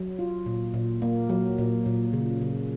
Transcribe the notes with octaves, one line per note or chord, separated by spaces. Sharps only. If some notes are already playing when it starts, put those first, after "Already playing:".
Already playing: F#3
F4
A#2
A#2
A#3
F#3
A#2
A#2
C#3
C#3